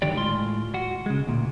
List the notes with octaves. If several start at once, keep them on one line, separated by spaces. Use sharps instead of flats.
D2 G2 D3 D#3 G4 D5
A2 G#3 F4 C6
F#4
C#3 G#3
D2 A#2